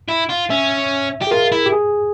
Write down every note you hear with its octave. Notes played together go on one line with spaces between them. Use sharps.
E4
F4
C#4 E5
G4
G#4
F4 A#4
E4
G4
G#4